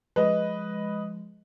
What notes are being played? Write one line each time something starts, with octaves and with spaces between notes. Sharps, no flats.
F3 G#3 B4 D#5